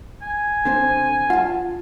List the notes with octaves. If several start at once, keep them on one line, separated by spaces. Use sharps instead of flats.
G#5
D3 C4 C5
F4 F#5 A5